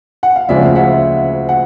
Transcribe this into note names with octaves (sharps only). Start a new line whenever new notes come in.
F#5
F5
D2 C#3 F3 G#3 D5 E5
F5
E5 F#5
F#5